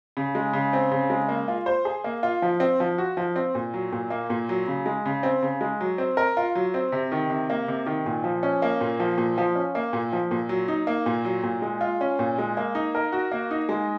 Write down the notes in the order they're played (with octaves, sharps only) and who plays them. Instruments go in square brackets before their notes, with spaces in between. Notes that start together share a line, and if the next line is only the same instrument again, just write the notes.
[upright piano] C#3
G#3
C#3
C4
C#3
G#3
A#3
F4
C5
G#4
A#3
F4
F3
C4
F3
F#4
F3
C4
A#2
F#3
A#2
A#3
A#2
F#3
C#3
G#3
C#3
C4
C#3
G#3
F#3
C4
A#4
F4
F#3
C4
C3
D#3
C3
A#3
C3
D#3
A#2
F3
C#4
A#3
A#2
F3
A#2
F3
C#4
A#3
A#2
F3
A#2
F#3
D#4
A#3
A#2
F#3
A#2
G#3
F4
C#4
A#2
G#3
A#3
D#4
A#4
F#4
A#3
D#4
G#3